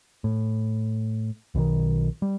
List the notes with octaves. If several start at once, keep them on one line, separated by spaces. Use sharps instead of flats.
A2
B1 B2 D3 D#3
G3